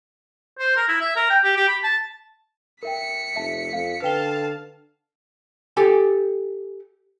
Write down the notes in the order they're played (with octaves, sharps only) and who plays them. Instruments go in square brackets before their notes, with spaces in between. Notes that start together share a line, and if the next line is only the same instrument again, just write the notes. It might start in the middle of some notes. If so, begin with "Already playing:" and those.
[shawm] C5
A#4
E4
E5
A#4
G5
G4
G4
B5
A5
[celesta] A#4 E5 G5 [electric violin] B6 C#7
[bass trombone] F1 [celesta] E5 A5
[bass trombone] F2 [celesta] F5
[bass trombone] D3 [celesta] B4 G5 G7 [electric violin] F5 A5
[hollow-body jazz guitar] G4 A4 G#5